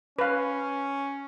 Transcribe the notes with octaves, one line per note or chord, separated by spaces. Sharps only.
C#4 B4 F5